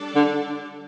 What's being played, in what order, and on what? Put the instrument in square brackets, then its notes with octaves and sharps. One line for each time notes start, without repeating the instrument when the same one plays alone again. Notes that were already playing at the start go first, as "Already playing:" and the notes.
Already playing: [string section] G3 D4 A4 D5
[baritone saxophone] D3